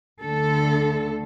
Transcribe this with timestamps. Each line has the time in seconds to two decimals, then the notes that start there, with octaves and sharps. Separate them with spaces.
0.22 D2 D3 A3 A4